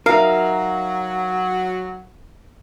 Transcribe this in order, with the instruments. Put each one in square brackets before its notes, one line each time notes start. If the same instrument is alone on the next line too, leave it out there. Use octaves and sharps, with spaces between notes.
[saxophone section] F#3 [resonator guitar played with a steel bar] D#4 E5 [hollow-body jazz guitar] A#4 [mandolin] F5